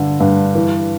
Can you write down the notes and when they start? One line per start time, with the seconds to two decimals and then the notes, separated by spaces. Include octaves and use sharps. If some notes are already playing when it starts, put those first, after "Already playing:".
Already playing: G2 D3
0.20 G2
0.55 E3